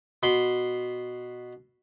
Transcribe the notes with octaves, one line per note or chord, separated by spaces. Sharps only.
B2 B5 C6